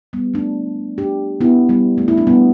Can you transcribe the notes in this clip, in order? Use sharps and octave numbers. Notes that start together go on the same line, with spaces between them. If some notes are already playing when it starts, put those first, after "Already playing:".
G3 B3
A3 D4
D4 G4
B3 E4
G3 B3
A3
E4
D4
G3 B3